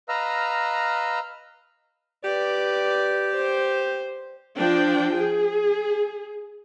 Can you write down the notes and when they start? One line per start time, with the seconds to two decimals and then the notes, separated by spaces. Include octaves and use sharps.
0.09 B4 D#5 F5 A#5 E6 F6
2.24 G4 B4 D5
3.34 C5
4.55 F3 D4 G5
5.15 G#4